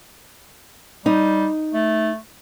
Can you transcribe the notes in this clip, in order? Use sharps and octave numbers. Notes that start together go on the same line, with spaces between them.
G3 D#4
A3